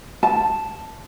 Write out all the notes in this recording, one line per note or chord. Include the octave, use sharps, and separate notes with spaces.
A5